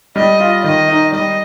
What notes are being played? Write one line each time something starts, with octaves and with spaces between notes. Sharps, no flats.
G3 D#5
F4
D#3 D#5
D#4
G3 D#5